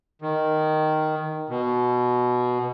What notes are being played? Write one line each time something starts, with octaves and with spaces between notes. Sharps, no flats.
D#3
B2